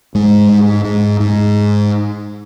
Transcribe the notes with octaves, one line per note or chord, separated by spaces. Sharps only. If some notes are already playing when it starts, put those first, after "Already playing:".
G#2 G#3
G#2
G#2
G#2